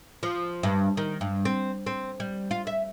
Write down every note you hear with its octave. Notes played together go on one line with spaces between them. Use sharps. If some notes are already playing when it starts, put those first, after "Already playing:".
F3
G2
D#3
G2
C4
C4
G3
F4
E5